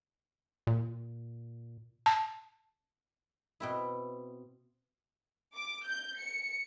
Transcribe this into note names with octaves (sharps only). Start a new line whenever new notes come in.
A#2
A5
B2 C4 E4
D6
G6
C#7